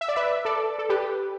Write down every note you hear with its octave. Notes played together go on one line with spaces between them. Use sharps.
E5
D5
B4 E5
A4 D5
A4
G4 B4